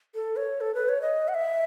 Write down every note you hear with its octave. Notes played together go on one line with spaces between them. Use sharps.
A4
C#5
A4
B4
C#5
D#5
F#5
E5